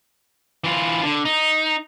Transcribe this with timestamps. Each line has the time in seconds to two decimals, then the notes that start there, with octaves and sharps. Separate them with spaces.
0.64 E3 F4
1.03 D3
1.25 D#4